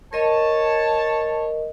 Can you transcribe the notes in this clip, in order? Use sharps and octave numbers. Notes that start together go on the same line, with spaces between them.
A#4 C#5 D#5 A5